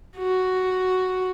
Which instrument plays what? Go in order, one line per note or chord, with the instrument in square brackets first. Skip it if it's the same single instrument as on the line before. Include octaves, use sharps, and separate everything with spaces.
[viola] F#4